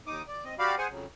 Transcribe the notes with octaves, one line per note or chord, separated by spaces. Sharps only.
D#2 D#4 D6 D#6
D5
C4 D#5
F#4 G4 D5 F5 B5
G#4 C5 F#5 G#5
F2 C#3 F#3